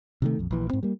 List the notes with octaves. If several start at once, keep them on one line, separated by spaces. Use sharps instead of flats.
C3 D#3 A3
A#1 F2
A#1 E3
G#2 C4
G3 A#3